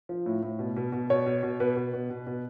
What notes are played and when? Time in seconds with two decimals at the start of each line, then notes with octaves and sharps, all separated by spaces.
0.09 F3
0.26 A2
0.42 A2
0.59 B2
0.77 B2
0.92 B2
1.10 B2 C#5
1.26 B2
1.43 B2
1.60 B2 B4
1.76 B2
1.94 B2
2.10 B2
2.27 B2